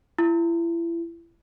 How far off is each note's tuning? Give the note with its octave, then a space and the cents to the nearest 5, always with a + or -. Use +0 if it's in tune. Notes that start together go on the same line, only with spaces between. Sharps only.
E4 +30